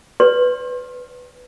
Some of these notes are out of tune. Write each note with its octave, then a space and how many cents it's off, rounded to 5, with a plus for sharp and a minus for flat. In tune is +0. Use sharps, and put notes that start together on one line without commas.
B4 +0 D5 -40 C6 +40